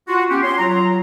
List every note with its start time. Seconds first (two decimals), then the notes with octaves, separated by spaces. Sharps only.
0.08 F4 F#4
0.30 B3 C#4 G4
0.43 C#5 C6
0.58 F#3 F4 A#5